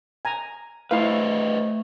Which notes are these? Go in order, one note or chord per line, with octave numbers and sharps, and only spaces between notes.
G#5 A#5
A3 E4 B4 C5 D#5 F5